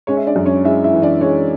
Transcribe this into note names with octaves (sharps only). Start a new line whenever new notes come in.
G#3 C#4 C#5
E5
D4 D5
F#2
C#4 C#5
G#3 E4 E5
E4 E5
E3
D4 D5
G#3 C#4 C#5